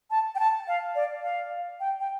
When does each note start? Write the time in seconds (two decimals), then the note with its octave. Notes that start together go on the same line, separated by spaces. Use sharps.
0.10 A5
0.35 G5
0.39 A5
0.68 F5
0.95 D5
1.23 F5
1.80 G5
2.00 G5